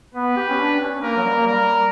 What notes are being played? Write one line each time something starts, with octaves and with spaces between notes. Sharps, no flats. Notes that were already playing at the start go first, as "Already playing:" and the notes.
B3 B4
G4
C#4
D4
C#4
A#3 A#4
F#3
G3
A#3
G3 A#4